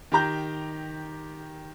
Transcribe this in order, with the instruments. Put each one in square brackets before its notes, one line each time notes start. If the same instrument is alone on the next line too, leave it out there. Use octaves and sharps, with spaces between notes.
[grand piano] D#3 G4 A#5 G6